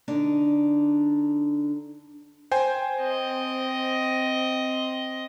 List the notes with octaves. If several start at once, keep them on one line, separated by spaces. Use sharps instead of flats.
D3 D4 D#4
C5 G5 G#5
C4 D#5